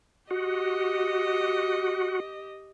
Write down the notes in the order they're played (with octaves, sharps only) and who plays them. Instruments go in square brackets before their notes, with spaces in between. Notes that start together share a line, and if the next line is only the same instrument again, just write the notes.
[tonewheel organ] F#4 [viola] G4 D#5